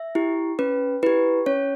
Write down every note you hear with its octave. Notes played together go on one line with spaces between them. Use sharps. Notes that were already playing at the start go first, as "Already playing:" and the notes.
Already playing: E5
E4 G4
C#4 B4
E4 G4 B4
C#4 C#5